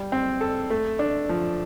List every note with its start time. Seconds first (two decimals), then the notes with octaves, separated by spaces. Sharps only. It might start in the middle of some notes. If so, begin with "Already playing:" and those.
Already playing: G3
0.12 C4
0.41 A4
0.70 A3
0.99 D4
1.29 F3